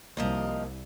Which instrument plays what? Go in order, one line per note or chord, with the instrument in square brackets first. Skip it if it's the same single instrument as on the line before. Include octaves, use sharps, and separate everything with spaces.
[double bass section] C2 [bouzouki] F3 D#5 A#5 [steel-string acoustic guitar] A#3